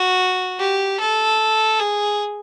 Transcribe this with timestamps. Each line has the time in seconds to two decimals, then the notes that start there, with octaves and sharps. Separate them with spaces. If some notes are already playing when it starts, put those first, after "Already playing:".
Already playing: F#4
0.60 G4
1.00 A4
1.79 G#4